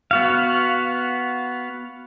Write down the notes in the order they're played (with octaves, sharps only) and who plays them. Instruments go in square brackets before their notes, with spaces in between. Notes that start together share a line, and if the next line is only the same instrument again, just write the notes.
[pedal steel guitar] B3 F#4 F5